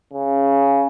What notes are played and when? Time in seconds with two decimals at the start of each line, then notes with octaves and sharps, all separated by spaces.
0.13 C#3